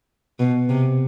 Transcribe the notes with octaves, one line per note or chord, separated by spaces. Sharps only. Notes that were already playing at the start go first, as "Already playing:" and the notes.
B2
C3